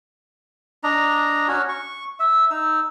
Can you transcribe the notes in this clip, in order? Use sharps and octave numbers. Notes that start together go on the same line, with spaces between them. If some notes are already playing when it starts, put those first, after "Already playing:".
D4 D#5 A#5
C#4 F#4 C#5
C#6
E5
D#4 E6